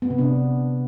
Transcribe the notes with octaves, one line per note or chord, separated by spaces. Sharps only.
B3
C3
D4